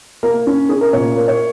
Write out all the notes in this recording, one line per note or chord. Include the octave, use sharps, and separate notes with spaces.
A#3 A#4
C#4
C#4 G#4
A#4
A#2 C#5
A#3
C#5